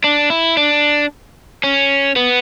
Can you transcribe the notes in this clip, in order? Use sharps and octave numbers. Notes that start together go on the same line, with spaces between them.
D4
E4
D4
C#4
B3